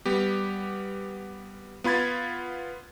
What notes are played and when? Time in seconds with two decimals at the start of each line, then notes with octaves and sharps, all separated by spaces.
0.06 G3 B3 G4
1.84 B3 F4 B5 G#6 A6